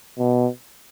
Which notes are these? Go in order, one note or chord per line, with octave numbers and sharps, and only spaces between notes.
B2